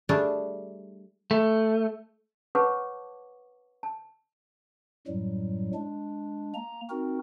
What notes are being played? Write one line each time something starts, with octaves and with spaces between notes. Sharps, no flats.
G3 A3 D4 G#4 A5
A3
B4 C#5 F#5 A5 C#6 D6
A5
F#2 A2 F#3 G3
G#3 D4
A#3 A#5
C4 D#4 F#4 A#4